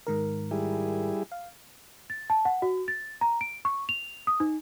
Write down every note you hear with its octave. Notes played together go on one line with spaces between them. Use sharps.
G#2 D#3 A#4
G3 E4 G#4
F5
A6
A5
F#5
F#4
A6
A#5
D7
C#6
F7
D#6
D#4